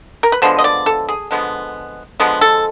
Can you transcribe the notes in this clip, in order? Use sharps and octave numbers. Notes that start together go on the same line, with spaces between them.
A#4
B4
D3 F3 G#3 B3 C5
D#5
D5
A4
G#4
D3 F3 G#3 B3
D3 F3 G#3 B3
A4